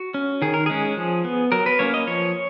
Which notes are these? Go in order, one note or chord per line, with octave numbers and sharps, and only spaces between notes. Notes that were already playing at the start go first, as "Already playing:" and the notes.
Already playing: F#4
C#4
D#3 G#4
A#4
G#3 C#4 G#4
F3
B3
F#3 A#4
B4
A#3 C#4 C#5
D#5
F3 C#5